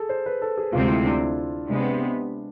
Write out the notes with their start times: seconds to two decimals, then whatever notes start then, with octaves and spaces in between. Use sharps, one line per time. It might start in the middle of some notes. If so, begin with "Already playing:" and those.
Already playing: G#4 A4
0.09 C5
0.26 B4
0.42 A4
0.58 G#4
0.73 D2 C3 G#3 C4 F4
0.85 F4
0.89 E4
1.05 D4
1.68 C3 G#3 B3 D4